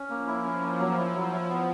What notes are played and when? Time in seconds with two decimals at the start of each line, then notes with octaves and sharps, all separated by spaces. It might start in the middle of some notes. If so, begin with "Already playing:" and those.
Already playing: C#4
0.10 F3 A#3
0.27 E4
0.44 C#4
0.62 A#3
0.79 F#3
0.97 E4
1.14 F#3
1.32 E4
1.49 B3